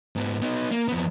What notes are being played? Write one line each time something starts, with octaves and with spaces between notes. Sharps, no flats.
G#2 B3
B3 D#4
A#3
F2 B3